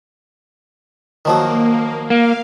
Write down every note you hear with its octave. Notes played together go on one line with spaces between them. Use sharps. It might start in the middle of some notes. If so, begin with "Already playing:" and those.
D#3 F3 F#3 A#3
A#3 F5